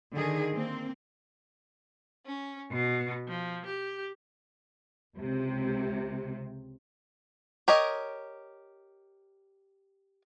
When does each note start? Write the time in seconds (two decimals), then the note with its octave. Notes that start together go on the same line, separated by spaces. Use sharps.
0.14 D3 D#3 G#4
0.53 A#3 C4
2.26 C#4
2.72 B2
3.27 F3
3.65 G4
5.16 C#2 C3
7.68 G4 A#4 C#5 D#5